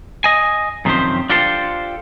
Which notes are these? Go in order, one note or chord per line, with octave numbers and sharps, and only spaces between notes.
D#5 G#5
F#2 C3 D#3 F3 G4 C5
D4 F4 G4 A4 C5